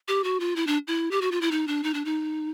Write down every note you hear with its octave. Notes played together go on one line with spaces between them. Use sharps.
G4
F#4
F4
E4
D4
E4
G4
F#4
F4
E4
D#4
D4
D#4
D4
D#4